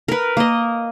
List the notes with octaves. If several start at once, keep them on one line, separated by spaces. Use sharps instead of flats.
A#4 B4
A#3 D#5